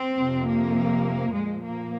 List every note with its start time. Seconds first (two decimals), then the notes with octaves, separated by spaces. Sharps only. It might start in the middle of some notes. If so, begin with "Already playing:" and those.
Already playing: C4
0.16 F2 C3 F3
0.46 A#3
1.33 A#2 F3 G#3
1.63 A#3